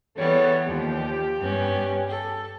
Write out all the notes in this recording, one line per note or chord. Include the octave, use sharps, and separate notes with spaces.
E2 E3 G3 B3 A4 C#5
D#2 F3 G4
G2 B3 C#4
A4